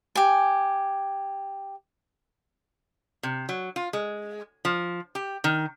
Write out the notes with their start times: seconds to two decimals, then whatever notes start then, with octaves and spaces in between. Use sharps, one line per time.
0.16 G4 G#5
3.23 C3
3.49 F#3
3.76 F4
3.93 G#3
4.65 F3
5.15 G4
5.44 D#3